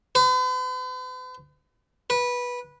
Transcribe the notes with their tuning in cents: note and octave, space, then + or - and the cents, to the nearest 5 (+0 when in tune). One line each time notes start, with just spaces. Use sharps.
B4 +45
B4 -15